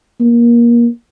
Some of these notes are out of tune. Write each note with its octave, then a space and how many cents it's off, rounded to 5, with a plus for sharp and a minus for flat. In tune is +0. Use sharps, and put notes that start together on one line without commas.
A#3 +25